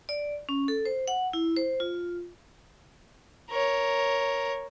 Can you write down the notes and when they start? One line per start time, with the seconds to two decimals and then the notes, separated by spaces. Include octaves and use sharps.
0.09 D5
0.49 C#4
0.68 A4
0.85 C5
1.08 F#5
1.33 E4
1.56 C5
1.80 F4
3.50 A#4 C#5